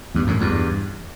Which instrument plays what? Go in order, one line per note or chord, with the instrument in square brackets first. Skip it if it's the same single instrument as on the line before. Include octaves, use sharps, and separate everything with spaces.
[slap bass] E2 G2
F#2 A2
E2 G2